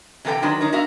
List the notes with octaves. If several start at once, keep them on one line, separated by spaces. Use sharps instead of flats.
C3 E3 A#3 A4 B4 G5
D#3 F#3 G#3 D4 B4
D4 D#4 A#4 C#5
B3 F#4 A#4 E5 F5